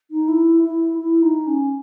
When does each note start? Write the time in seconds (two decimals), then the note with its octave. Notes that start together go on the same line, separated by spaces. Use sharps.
0.11 D#4
0.28 E4
0.63 E4
0.98 E4
1.22 D#4
1.47 C#4